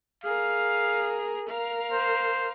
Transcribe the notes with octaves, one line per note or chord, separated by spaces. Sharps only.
G#4 A#4 F5
A#4 F5
C5